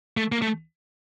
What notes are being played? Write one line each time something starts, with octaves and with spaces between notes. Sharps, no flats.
A3
A#3
A3